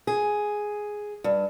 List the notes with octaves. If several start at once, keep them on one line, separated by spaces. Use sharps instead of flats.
G#4
G2